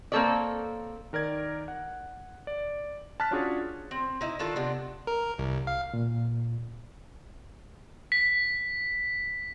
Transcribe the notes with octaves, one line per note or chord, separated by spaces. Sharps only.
A#3 C4 C#4 A4 C#5 D5
D#3 A#4 D5 G#6
F#5
D5
A5 F6 F#6 A6 B6
C#4 D4 F4 F#4 G#4 C#5
C4
D#4 E4 D#5
D#3 D4 F4 A4
C3 B3 D4
A#4
C2
F5
A#2
B6